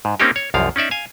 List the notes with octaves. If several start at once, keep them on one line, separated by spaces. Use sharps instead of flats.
G#2
A#3 C4 C#4 D#4 G4
C#5
C2 F#2 F3 F5
C#4 D#4 D5 E5
F5 G#5